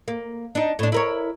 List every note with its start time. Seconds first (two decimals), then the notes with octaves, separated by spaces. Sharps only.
0.08 A#3
0.55 D4 D#4
0.79 A2 D4
0.92 E4 A#4 C#5